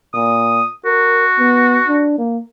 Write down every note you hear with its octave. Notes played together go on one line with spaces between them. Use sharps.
A#2 D#6
F#4 A#4
B3
D4
A#3